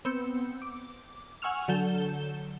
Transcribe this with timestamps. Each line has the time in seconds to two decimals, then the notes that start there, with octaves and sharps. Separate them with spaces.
0.05 B3 C4 E6 G6 C#7
0.62 D6
1.42 F#5 G#5 C#6 E6 F6 F7
1.68 D3 F#3 A4 G6 E7 G7